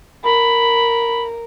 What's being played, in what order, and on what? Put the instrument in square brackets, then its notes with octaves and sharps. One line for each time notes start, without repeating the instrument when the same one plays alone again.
[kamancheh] A#4 [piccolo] B5